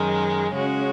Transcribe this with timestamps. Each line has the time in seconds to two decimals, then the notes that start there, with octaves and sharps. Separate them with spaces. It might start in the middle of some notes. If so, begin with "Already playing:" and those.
Already playing: F#2 D#3 G#3
0.52 C#3 G#3 C#4 F#4